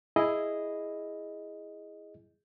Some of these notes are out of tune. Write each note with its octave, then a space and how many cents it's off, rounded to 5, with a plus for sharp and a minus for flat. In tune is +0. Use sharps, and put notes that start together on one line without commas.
E4 +0 G#4 +0 D#5 +0